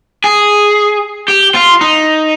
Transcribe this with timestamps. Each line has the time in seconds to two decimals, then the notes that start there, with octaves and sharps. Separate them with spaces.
0.24 G#4
1.28 G4
1.55 F4
1.81 D#4